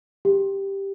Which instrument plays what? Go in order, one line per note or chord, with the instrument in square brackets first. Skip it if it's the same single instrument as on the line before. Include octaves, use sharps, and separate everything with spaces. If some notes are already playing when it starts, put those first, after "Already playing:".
[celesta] G4